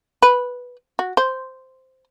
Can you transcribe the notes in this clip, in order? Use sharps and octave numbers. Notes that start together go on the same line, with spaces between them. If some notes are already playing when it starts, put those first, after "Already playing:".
B4
F#4
C5